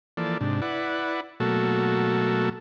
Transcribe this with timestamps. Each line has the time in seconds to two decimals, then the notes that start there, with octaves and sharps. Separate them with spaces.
0.17 E3 F3 A#3 A4 D5
0.41 G#2 C3 D4
0.62 E4 B4 D5 F#5
1.40 B2 F#3 A3 A#3 F#4 A4